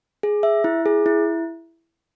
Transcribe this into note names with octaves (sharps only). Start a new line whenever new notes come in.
G#4
E5
E4
G#4
E4